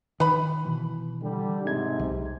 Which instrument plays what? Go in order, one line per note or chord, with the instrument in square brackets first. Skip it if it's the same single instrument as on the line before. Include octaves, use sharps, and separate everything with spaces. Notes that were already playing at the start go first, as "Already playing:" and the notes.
[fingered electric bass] D#3 [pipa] B4 B5
[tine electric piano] B2 E3
[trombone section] D3 G3
[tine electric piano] G1 G#6 [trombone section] G#2 C3
[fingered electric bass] B1